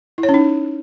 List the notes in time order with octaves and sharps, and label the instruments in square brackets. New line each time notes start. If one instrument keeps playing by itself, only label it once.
[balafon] E4
C#5
C#4
D#4